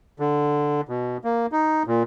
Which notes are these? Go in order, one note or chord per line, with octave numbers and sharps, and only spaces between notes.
D3
B2
A#3
D#4
A#2